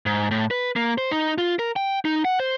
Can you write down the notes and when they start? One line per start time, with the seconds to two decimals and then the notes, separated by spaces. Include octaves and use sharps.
0.06 G#2
0.31 A2
0.51 B4
0.76 A#3
0.98 C5
1.11 D#4
1.38 F4
1.59 A#4
1.76 G5
2.05 D#4
2.25 F#5
2.40 C5